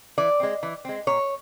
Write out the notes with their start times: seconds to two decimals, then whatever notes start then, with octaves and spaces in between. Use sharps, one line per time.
0.18 E3 D5
0.40 G#3 C4
0.63 E3
0.85 G#3 C4
1.07 A#2 C#5